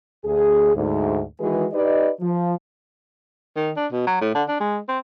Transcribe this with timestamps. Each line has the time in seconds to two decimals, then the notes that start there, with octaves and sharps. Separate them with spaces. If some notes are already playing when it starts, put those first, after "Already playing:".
0.24 D2 G#4
0.75 D2 G#2
1.40 D#3 E3 G#3 F#4 G#4 B4
1.72 D#4 G4 B4 D5 D#5
2.21 F3
3.56 D#3
3.77 D4
3.92 B2
4.07 F#3
4.21 A2
4.35 D3
4.48 D4
4.60 G#3
4.88 C4